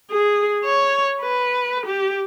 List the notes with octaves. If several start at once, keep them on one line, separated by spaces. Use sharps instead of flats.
G#4
C#5
B4
G4